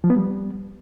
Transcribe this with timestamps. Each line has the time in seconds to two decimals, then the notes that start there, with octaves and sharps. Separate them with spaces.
0.04 F3
0.10 B3
0.16 G3